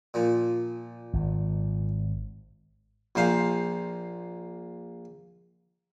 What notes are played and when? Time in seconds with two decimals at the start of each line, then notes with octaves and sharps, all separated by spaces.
0.14 A#2 F3
1.13 G#1
3.15 A#1 A#2 C5 F5